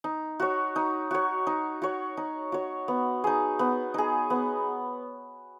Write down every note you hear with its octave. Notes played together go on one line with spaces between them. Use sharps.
D#4
F#4 C#5
D#4
F#4 C#5
D#4
F#4 C#5
D#4
F#4 C#5
B3
D#4 G#4
B3
D#4 G#4
B3